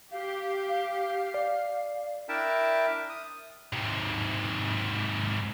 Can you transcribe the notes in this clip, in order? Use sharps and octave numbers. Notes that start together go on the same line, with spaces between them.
G4 F5
D5
D4 E4 A#4 E5 G5 A5
D#6
G#2 C3